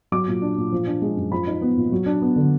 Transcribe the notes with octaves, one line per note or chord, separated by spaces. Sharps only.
F#3 D6
A#2
D4
A#2
F3
D4
G#3
F#2
F3 B5
D#4
B3
A#2
F#3
D4
B3
D3